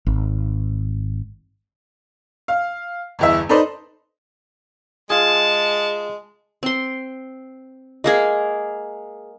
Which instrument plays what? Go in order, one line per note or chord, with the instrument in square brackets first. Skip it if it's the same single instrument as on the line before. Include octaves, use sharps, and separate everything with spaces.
[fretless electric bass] G#1
[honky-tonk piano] F5
G1 E2 E5
D#4 A4 B4 C5 D5 D#5
[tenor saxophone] G#3 [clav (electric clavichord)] F4 G#4 [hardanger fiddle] A5
[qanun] C4 C6
G#3 A#3 G#4